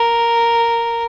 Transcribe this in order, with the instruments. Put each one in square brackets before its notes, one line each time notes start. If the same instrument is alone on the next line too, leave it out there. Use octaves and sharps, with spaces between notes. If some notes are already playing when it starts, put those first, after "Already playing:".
Already playing: [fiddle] A#4